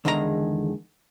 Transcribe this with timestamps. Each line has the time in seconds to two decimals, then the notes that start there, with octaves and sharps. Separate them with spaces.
0.05 E2 D3 D#3 G#3 G#4 A#5